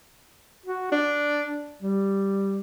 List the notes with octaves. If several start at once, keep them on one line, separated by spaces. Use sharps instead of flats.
F#4
D4
G3